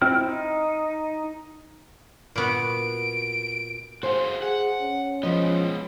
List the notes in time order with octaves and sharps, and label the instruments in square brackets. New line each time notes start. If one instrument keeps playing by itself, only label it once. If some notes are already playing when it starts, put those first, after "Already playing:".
[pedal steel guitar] C4 E4 F4 G5 F6
D#4
[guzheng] A#2 B3 F#4 [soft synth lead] D7
[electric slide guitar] F#4 G#4 F5 [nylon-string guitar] C5
[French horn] G#4 [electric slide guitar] F#5
[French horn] C#4
[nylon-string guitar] F3 D#5 [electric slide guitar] G#3 B3